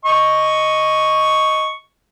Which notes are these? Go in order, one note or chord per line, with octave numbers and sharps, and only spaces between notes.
D#5 C#6